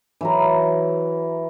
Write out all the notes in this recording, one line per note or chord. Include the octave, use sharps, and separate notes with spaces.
E3 F#3 A#4